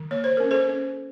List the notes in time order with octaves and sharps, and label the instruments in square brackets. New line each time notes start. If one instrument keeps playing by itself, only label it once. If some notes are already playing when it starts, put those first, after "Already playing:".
Already playing: [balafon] D#3
A#3 C#5
C5
C#4 A#4
A4 C5
C#4